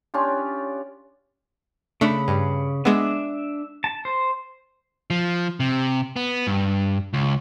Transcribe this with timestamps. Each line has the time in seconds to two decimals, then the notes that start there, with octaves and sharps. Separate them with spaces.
0.14 C#4 D4 F4 G4
2.01 C#3 A3 D4 B5
2.28 G2
2.85 G#3 B3 D4 E5
3.84 A5
4.05 C5
5.10 F3
5.60 C3
6.16 B3
6.47 G2
7.13 C#2